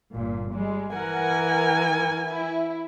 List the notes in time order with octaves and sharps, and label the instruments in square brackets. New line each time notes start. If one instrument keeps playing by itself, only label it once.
[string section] G1 A#2
G3 G#3
[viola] E3 G#5 [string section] A#4 F#5
[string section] E4